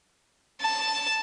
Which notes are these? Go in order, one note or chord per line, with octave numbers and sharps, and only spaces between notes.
A5